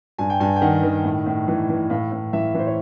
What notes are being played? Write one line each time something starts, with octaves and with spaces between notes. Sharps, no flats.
G2 G#5
G5
G2 G#5
G5
D#3 F#5
D#3
A2
A2
E3
E3
A2 F5
A2
E3 E5
E3 C5
C#5